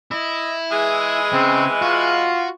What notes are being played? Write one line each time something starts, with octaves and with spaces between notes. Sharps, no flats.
E4 D#5
E3 G#3 G#4
C#3 C4
F4 F#4 F5